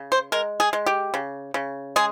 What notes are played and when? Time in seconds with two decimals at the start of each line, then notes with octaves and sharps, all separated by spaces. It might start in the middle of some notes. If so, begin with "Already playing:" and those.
Already playing: C#3
0.12 C5
0.32 G#3 A#4
0.60 G#4
0.73 G#3
0.86 G4
1.14 C#3
1.54 C#3
1.96 G#3 G#4